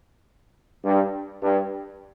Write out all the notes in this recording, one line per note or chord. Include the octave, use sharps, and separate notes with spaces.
G2
G2